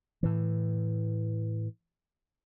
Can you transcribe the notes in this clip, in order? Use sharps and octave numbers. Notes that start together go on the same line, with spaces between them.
A2 E3